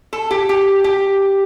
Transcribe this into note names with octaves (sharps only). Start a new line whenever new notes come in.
A4
G4
G4
G4